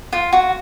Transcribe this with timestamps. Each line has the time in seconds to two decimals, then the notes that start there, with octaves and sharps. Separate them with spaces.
0.13 F4
0.33 F#4